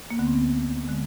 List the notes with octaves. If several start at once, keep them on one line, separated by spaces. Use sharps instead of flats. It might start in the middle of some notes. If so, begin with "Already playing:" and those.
A#3
D2 D3 B3
C4
B3
D3 G#3